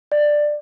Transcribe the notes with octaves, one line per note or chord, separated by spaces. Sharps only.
D5